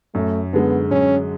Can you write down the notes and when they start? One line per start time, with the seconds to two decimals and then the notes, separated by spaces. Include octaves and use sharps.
0.15 F#2 A3
0.53 D3 G#3 B3
0.91 F#2 C#4